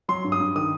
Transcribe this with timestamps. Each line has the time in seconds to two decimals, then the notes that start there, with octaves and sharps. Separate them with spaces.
0.08 F#3 C6
0.24 G2
0.32 D#6
0.40 G2
0.56 D#3 D#6